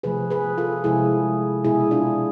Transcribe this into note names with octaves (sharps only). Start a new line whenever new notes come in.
C3 F3 A3 G#4 B4
G#4 B4
F4 A4
C3 F3 G#3 E4 G#4
B2 G#3 E4 G#4
D4 F4